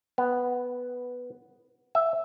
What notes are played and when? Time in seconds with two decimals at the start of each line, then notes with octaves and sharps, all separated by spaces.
0.18 B3
1.95 E5